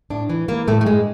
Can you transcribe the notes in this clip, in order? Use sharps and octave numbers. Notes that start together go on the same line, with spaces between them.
A2 D4
E3
E3 A#3
A2 A3
A3
G2 G#3